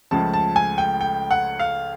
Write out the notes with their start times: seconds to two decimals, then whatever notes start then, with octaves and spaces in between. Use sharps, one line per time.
0.11 C#2 C#3 F3 A3 A5
0.33 A5
0.56 G#5
0.78 G5
1.01 G5
1.31 F#5
1.59 F5